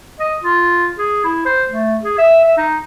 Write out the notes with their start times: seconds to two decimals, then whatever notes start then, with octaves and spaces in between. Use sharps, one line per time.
0.20 D#5
0.43 F4
0.99 G#4
1.24 E4
1.46 C5
1.69 A3
2.03 G#4
2.18 E5
2.44 E5
2.57 D#4